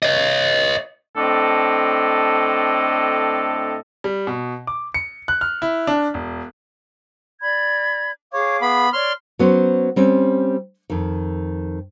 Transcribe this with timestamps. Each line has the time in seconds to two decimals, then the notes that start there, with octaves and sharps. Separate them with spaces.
0.03 C#5 D#5
1.16 A2 C4 D4 A4 D#5
4.04 G3
4.27 B2
4.67 D6
4.94 C#7
5.28 F#6
5.41 F6
5.62 E4
5.87 D4
6.14 E1
7.41 D5 B5 G#6
8.33 G#4 C#5 F5 D6
8.62 B3 B5
8.93 C#5 D5 C6 C#6 F6
9.39 F#3 B3 C#4 C5
9.96 G3 C4 C#4
10.90 F2 D#3